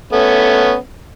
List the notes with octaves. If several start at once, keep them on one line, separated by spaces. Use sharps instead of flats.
A3 B3 C#4